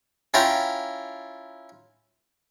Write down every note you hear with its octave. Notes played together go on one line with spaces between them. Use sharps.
C#4 E4 F4 G5 A#5